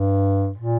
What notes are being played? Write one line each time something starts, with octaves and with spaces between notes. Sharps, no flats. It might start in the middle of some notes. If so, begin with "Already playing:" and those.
Already playing: G2
A#2